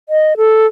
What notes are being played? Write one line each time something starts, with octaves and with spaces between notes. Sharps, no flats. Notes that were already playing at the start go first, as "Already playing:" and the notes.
D#5
A4